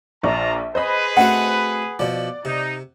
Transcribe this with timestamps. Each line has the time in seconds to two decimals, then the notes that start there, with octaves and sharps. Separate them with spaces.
0.23 A#1 F4 D5 A5 A#5 C#6
0.75 G#4 B4 C5 D#5 B5
1.17 A3 C4 F#4 F#5
1.99 B2 F3 D5
2.45 C3 D#4